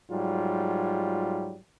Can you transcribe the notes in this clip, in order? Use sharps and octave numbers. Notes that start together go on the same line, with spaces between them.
G#2 F#3 G3 F4